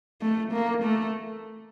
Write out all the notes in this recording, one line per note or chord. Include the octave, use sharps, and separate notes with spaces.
A3
A#3
A3